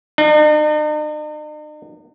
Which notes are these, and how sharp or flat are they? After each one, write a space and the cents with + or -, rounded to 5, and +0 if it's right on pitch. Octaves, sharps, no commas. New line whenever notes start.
D#4 -45